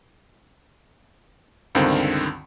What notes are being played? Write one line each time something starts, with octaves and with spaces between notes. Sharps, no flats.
C#2 G2 D3 D#3 C4